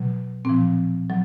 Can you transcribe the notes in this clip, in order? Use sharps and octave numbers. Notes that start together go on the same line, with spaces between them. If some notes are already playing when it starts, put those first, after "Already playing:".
Already playing: B2 F#3
A#2 F3 C4
F#3